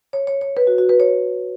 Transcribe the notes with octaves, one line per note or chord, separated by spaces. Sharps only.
C#5
C#5
C#5
B4
F#4
F#4
B4
C#5